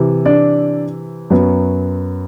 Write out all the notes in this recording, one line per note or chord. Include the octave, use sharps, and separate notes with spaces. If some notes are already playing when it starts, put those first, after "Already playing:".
Already playing: C3 E3
D4 D5
F#2 F#3 B3